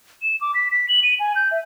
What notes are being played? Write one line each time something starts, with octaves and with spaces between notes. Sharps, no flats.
E7
D6
B6
B6
F#7
D#7
G#5
G6
E5